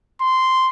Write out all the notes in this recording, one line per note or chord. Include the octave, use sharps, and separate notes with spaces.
C6